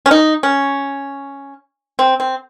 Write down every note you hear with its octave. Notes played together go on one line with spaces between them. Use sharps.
C#4
D#4
C#4
C4
C4